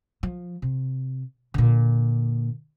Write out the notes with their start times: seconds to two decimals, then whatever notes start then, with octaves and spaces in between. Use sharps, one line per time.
0.23 F3
0.62 C3
1.54 A#2 D3